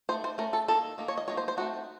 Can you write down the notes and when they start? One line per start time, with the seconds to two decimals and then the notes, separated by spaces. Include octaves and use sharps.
0.09 D#4 C5
0.11 A3
0.24 C5
0.38 A3 C#4 A#4
0.53 A4
0.68 D#3 A#3 D#4 A4
0.98 D#3 A#3 D#4
1.08 C#5
1.18 D#5
1.28 F#3 A#3 D#4 C#5
1.37 C5
1.48 C5
1.57 A3 C4 D#4 F#4